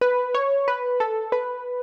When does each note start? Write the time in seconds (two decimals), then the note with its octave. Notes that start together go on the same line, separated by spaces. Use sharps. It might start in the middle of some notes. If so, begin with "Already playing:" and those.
0.01 B4
0.34 C#5
0.68 B4
1.00 A4
1.32 B4